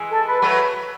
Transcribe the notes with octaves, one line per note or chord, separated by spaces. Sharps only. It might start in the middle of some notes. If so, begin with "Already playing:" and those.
Already playing: E3 G#3
A4
B4
F#3 A3 B4